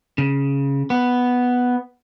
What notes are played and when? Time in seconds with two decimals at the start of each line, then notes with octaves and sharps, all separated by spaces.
0.18 C#3
0.90 B3